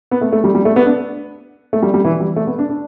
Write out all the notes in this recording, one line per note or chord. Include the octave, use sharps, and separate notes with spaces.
B3
A3
A3
G3
G3
A3
B3
D4
A3
G3
G3
E3
G3
A3
B3
D4
D4